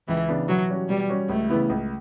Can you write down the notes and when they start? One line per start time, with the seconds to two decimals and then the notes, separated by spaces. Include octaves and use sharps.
0.08 C#2 E3
0.29 C#3 E3 B3 D4
0.48 B2 F#3
0.69 G3 C#4 F#4
0.89 B2 G3
1.09 G3 C#4 F#4
1.29 C#2 A3
1.49 C#3 E3 B3 E4
1.70 C#2